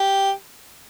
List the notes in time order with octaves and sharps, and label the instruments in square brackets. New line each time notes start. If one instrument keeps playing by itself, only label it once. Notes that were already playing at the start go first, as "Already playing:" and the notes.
Already playing: [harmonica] G4